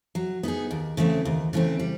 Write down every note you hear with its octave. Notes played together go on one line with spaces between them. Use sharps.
F#3
B3 D#4 G#4
D#2
C#3 E3 A3 C4
D#2
C#3 E3 A3 C4
G3